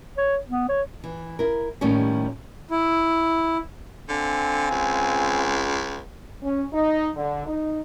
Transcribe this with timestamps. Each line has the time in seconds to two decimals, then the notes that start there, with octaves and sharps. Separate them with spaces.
0.17 C#5
0.49 B3
0.69 C#5
1.04 E3
1.39 E4 A#4
1.81 D#2 A2 D#3 F3 G3 C#4
2.71 E4
4.09 D3 C4 F5 G#5
4.71 C#2
6.42 C#4
6.73 D#4
7.15 D3
7.46 D#4